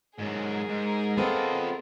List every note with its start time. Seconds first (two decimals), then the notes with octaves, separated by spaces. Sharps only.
0.18 G#2 F#3 G#4 A#4
0.69 G#2
1.18 B3 C4 F4 A4 D#5